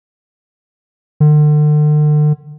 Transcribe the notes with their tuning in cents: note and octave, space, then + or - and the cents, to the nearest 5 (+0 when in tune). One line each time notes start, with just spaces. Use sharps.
D3 +40